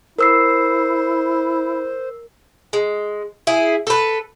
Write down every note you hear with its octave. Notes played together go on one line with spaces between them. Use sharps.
E4 A#4 C5 E6 C7
G#3
E4 G#4
A4 B4